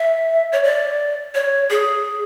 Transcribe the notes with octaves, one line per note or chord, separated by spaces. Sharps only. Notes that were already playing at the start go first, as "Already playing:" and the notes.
Already playing: E5
C#5
D5
C#5
G#4